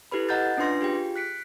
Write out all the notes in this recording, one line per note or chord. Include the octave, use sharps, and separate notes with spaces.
E4 G4 A4 B4 B5
D#5 F#5 A#5 F#6 G6 A6
C#4 D4 F4 B4 C6 A#6
F4 G4 G#4 G5
F#6 B6 C#7 D7